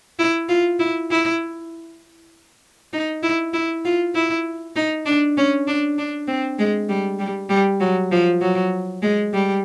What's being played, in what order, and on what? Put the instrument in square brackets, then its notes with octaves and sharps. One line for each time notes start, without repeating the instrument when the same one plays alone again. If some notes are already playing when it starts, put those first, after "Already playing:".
[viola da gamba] E4
F4
E4
E4
D#4
E4
E4
F4
E4
D#4
D4
C#4
D4
D4
C4
G#3
G3
G3
G3
F#3
F3
F#3
G#3
G3